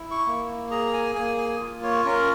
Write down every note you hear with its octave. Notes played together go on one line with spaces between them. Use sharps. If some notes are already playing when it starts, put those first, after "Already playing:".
Already playing: E4
C#6
A#3
G#4 A#5
G#5
A#3 G#5
G#5
F4
C#5
C#4 A#4